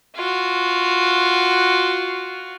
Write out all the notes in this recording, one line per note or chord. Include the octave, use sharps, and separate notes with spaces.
F4 F#4